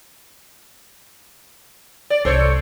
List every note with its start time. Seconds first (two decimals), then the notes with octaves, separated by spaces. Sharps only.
2.10 D5
2.25 C2 A4 C5 C#5